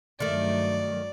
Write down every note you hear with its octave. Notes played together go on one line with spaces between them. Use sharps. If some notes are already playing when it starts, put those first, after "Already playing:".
G2 D#3 F#3 A3 D5